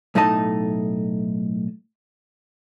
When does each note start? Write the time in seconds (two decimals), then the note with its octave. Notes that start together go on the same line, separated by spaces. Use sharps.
0.15 B1 A2 A3 D#4 D#5 A5